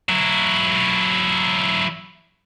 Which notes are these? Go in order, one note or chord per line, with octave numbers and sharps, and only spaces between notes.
F#3 E4